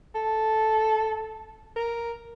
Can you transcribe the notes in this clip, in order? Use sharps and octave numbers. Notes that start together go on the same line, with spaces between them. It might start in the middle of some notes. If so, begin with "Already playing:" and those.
A4
A#4